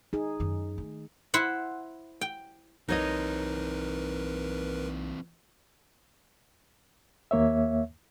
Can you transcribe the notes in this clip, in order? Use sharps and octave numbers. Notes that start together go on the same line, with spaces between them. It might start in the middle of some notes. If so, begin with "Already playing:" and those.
D#4 G#4
F#2 D#3
D#3 A3
E4 C5 F#5
G5
B1 E3 C4 D#4 A#4 B4 C#5 D#5
D#2 A#3 C#5 E5